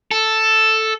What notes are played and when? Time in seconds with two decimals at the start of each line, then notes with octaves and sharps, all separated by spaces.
0.11 A4